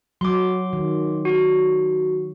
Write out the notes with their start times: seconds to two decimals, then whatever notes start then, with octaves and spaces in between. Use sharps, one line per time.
0.21 F#3 C6 D6
0.73 D#3
1.25 F#4